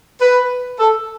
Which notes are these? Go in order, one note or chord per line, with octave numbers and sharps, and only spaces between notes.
B4
A4